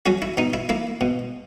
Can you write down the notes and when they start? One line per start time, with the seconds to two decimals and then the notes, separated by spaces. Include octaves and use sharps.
0.06 F#3 C#4 F#4
0.22 E4
0.37 B2 D#4
0.54 E4
0.69 A#3 E4
1.01 B2